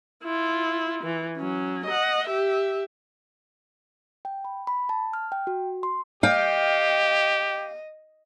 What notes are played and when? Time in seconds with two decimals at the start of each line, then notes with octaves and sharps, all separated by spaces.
0.24 E4 F4
1.04 E3
1.37 F#3 C#4
1.86 D#5 F#5
2.27 G4 E5
4.25 G5
4.45 B5
4.67 B5
4.89 A5
5.13 F6
5.32 G5
5.47 F#4
5.83 C6
6.23 G4 D#5 F5 G5